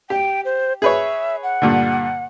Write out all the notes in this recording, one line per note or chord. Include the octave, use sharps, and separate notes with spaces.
G4 G5
C5
G#4 B4 C#5 E5
F#5
G2 A#2 D3